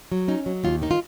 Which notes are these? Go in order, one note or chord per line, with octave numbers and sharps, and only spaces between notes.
F#3
C#4 D#4
F#3
D#2 F4
D#3 D#4
F4